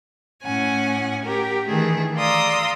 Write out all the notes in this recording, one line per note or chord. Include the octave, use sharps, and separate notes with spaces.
A2 C#4 F#5 G#5
G4 A#4
D#3 E3 A3 D4 G#4
D5 F5 A#5 C6 D#6 E6